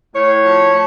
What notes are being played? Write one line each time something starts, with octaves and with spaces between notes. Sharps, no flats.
A2 C#5
F3
A3